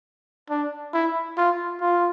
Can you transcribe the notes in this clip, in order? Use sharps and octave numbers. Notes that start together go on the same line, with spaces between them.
D4
E4
F4
F4